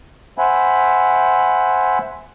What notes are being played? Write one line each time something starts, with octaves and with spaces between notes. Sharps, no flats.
C5 E5 F#5 G#5 B5